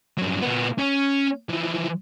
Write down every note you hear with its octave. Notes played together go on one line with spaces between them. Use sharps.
G2 F#3
A#2 B3
C#4
E3 F3